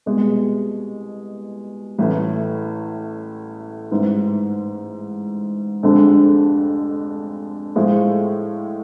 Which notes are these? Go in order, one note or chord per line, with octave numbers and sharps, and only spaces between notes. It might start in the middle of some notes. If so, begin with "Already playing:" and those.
C2 B2 G#3
A1 A2 E3
A1 G#2 E3
F1 F2 D3 G#3 D4
A2 F3 G#3